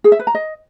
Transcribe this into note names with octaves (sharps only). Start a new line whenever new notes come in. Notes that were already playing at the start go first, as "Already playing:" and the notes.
G#4
E5
B4
A#5
D#5